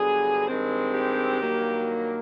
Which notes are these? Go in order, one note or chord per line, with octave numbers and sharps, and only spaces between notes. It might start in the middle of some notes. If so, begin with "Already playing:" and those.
Already playing: G2 D3 F#3 B3 G#4
G2 D#3 G#3 C4
G4
G2 D#3 F#3 A#3